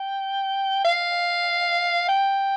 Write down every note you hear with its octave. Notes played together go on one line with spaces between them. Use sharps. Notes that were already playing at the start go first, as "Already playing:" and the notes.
Already playing: G5
F5
G5